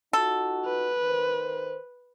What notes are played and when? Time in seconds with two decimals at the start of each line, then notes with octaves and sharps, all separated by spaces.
0.13 D#4 F4 F#4 A4
0.66 B4
1.01 D#3 A#4 C5